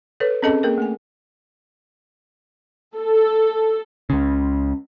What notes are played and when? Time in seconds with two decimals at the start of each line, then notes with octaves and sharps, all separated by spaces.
0.20 A4 B4 C#5
0.42 C4 C#4 G#4 A4 D#5 A5
0.63 A#3 G#4 A#4
0.78 A3 G#5
2.97 A4
4.10 C#2 C#3